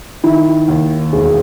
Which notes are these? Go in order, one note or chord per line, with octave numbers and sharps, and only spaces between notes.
D#3 E4
D#2
E1 G#4